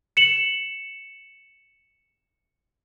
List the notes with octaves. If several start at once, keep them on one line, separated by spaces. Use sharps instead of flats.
C#7 E7 F#7